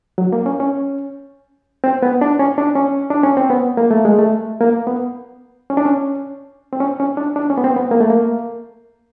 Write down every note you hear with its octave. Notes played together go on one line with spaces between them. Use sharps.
F#3
A#3
C#4
C#4
C4
B3
D4
C#4
D4
C#4
D4
C#4
C4
B3
A#3
A3
G#3
A3
A#3
B3
C#4
D4
C#4
C4
C#4
C#4
D4
D4
C#4
B3
C4
B3
A#3
A3
A#3